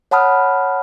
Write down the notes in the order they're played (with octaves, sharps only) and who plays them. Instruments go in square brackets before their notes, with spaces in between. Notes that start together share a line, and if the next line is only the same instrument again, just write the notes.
[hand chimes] C#5 F#5 A5 B5 D#6 F6